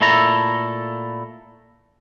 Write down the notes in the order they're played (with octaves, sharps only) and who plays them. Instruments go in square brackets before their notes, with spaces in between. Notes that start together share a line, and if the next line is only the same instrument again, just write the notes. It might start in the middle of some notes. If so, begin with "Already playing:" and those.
[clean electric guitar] A#2 A3 E4 A4 A#5